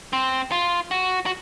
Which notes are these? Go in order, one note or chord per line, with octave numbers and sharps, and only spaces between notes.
C4
F4
F#4
F#4